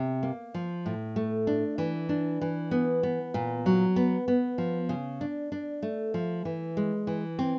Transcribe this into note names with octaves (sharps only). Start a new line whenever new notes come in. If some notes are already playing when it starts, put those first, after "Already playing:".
Already playing: C3
A#3
F3
A2
A3
D4
E3
D4
E3
B3
B3
A#2
F#3
B3
B3
F3
C#3
D4
D4
A3
F3
E3
G#3
E3
C4